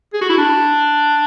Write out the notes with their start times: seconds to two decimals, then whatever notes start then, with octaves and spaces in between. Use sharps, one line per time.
0.14 G#4
0.22 F#4
0.30 E4
0.38 D4